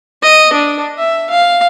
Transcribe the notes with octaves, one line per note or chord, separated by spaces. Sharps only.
D#5
D4
E5
F5